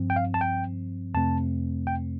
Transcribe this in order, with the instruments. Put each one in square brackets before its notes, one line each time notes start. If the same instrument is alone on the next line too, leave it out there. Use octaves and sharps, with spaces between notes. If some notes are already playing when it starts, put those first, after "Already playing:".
Already playing: [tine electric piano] G2 F3 C4
G5
F5
A5
G5
F2 C3 A3 C4 A5
G5